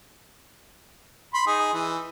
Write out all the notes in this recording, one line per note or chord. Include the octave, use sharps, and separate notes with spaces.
B5 C6
D#4 G#4
E3